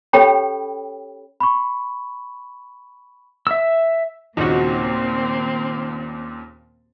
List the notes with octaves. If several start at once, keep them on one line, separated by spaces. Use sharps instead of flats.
C#4 G4 A4 C#5 G5 B5
B5 C#6
E5 E6
D#2 A#2 C#3 A#3 C4 D#4 F#4